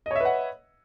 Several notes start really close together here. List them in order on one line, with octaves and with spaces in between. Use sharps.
D#5 C#5 E5 B4 F#5